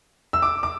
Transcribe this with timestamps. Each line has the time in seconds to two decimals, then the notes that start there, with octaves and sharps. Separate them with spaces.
0.33 E6
0.42 D6
0.63 D6